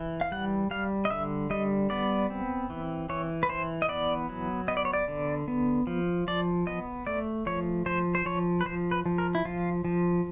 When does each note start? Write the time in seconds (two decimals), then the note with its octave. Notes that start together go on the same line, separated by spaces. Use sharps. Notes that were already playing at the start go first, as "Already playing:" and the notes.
Already playing: E3
0.21 F5
0.32 G3 F#5
0.71 G3 F5
1.05 D#5
1.10 D3 E5
1.50 G3 D#5
1.90 B3 D5
2.30 C4
2.70 E3
3.09 E3 C#5
3.43 B4
3.49 E3 C5
3.82 D#5
3.89 B3 D5
4.29 F#3
4.68 B3 D#5
4.77 D5
4.85 C#5
4.93 D5
5.08 D3
5.48 B3
5.87 F3
6.28 F3 D5
6.67 B3 D#5
7.07 A3 D5
7.46 F3 C#5
7.86 F3 C5
8.15 C5
8.26 F3 C#5
8.61 B4
8.66 F3 C5
8.91 B4
9.06 F3
9.18 A#4
9.35 E4
9.45 F3 F4
9.85 F3